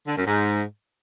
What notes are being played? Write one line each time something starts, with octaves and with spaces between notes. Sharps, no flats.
D3
F#2
G#2